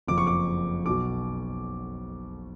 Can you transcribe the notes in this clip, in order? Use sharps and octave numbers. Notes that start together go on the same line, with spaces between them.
F#1 F2 F3 D6
C#6
D6
B1 B2 F#3 D6